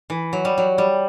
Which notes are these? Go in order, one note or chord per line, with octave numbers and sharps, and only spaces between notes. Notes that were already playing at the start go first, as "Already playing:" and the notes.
E3
F#3
G3
F#3
G3